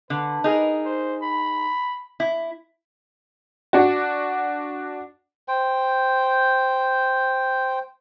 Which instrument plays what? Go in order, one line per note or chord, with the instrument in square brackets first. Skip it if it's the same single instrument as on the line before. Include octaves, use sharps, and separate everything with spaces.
[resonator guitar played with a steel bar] D3 [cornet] B4
[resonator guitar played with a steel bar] D#4 G#4 A#4
[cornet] C5
B5
[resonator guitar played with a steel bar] E4
[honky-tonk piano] D4 F#4
[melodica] C5 G5